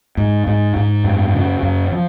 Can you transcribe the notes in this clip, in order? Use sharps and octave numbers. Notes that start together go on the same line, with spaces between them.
G#2
G#2
G#2
F#2
C#3
F#2
F3